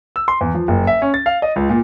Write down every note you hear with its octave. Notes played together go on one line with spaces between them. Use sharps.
E6
C6
E2
F3
F#1
E5
C#4
A6
F5
D#5
C#2
A#2